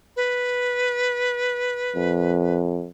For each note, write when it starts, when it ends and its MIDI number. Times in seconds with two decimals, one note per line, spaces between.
0.16 2.59 71
1.96 2.89 41